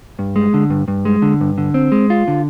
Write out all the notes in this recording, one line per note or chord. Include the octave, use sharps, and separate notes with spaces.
G2
G#3
D3
G2
G2
G#3
D3
G2
D3
C4
G#3
F4
D3